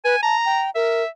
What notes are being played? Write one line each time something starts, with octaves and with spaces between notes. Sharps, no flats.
B4 G#5
A5 A#5
G5
A#4 E5